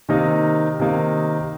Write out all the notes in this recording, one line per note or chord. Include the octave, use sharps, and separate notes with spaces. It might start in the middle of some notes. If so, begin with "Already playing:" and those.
C3 D#3 A#3 D#4
C3 D#3 A#3 D#4